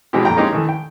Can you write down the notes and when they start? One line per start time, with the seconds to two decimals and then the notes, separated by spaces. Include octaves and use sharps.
0.13 B2 E3 F#3 G#3 C4 G4
0.25 F2 A#2 G5 A#5
0.37 G#3 A#3 C4 C#4 D#4 G4
0.53 D#3 E3 A3
0.69 G5